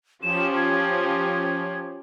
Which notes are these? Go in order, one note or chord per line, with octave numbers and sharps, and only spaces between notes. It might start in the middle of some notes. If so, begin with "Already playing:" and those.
F3 C#4 G4 E7
G#6